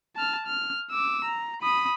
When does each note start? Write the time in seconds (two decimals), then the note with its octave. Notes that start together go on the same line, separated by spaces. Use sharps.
0.16 A5 F6
0.46 F6
0.91 D6 E6
1.25 A#5
1.62 B5 D#6